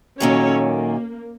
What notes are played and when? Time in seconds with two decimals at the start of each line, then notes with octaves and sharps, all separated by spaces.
0.20 F#2 A#2 D#3 C#4 A4 C#5
0.66 A#3